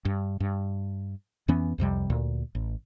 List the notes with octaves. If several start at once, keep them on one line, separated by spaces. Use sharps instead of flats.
G2
G2
F2 E3 B3 C#4
C2 F2 C3 G3
D2 A#2
A1